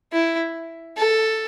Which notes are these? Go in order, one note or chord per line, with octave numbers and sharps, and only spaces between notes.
E4
A4